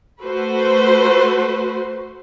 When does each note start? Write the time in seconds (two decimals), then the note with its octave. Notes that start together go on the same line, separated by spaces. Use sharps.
0.24 A3 F#4 B4 C5